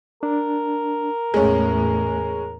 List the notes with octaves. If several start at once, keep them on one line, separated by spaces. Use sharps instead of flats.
D4 A#4
E2 A2 G#3 A3 C#4